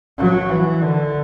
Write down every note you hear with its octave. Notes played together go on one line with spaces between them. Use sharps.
F#3
E3
D3